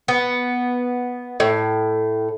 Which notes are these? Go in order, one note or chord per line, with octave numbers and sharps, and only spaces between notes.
B3
A2